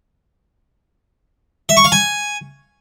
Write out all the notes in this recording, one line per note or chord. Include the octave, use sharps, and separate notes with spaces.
E5
C#6
F5
G#5